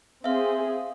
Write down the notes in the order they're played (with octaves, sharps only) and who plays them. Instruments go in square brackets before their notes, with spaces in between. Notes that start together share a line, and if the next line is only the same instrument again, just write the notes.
[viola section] C4 G#4 [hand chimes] E5 F5